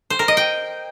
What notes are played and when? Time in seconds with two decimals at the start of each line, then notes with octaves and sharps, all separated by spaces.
0.10 C5
0.19 A#4
0.28 D#5
0.37 G5